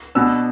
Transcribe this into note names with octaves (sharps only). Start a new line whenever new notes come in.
B2 B3 D4 E6